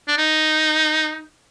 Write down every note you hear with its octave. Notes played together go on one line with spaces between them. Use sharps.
D4
D#4